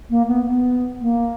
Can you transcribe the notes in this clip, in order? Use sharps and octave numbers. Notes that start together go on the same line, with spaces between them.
A#3
B3
B3
A#3